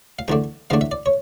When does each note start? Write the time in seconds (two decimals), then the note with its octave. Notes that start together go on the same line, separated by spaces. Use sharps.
0.19 F5
0.28 E2 D3 A3 D4 G5
0.70 E2 D3 A3 D4 F5
0.81 E5
0.91 D5
1.06 C#5